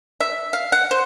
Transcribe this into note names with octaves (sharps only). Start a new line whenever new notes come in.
E5
F5
F#5
C5